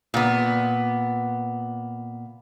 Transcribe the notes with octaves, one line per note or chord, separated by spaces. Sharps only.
A#2 B3